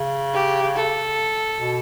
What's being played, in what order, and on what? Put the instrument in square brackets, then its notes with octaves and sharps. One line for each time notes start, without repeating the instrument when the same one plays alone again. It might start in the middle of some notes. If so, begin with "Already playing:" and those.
Already playing: [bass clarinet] C#3
[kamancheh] G4
A4
[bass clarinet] B2